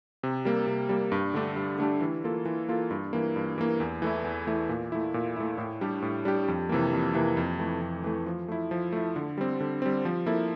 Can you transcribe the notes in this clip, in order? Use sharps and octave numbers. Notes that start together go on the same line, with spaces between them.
C3
G3 A#3
C3
G3 A#3
G2
D3 A3 D4 G4
G2
D3 A3 D4 G4
E3
A#3 F4 A4
E3
A#3 F4 A4
G2
E3 A#3
G2
E3 A#3
E2
E3 A3 E4
E2
E3 A3 E4
A#2
A3 E4
A#2
A3 E4
A2
G3 D4 G4
A2
G3 D4 G4
F2
C3 E3 A#3
F2
C3 E3 A#3
F2
E3 A3
F2
E3 A3
F3
A3 E4
F3
A3 E4
D3
G3 C4
D3
G3 C4
F3
A#3 E4 A4